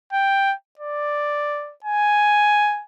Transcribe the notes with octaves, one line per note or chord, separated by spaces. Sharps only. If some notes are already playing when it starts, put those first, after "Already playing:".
G5
D5
G#5